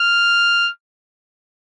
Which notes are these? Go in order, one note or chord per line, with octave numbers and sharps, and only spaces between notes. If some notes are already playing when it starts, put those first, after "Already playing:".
Already playing: F6